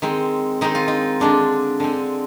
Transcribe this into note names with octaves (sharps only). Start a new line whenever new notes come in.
D#3 G#3 C4
D#3 G#3 C4 D#4
F4
D#4
D3 G#3 C4 D4
D3 G#3 C4